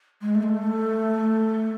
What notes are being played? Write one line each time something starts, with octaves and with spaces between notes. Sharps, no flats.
G#3
A3
G#3
A3